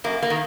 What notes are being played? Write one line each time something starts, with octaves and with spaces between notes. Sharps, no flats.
F#2 A#3
A#3
D#3